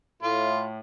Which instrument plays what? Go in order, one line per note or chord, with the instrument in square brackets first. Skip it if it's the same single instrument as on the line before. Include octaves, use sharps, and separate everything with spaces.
[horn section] A2 [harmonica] F4